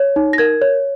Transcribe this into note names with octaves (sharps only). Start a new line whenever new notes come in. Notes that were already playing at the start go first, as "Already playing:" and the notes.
Already playing: C#5
D#4
A#6
A#4 G#6
C#5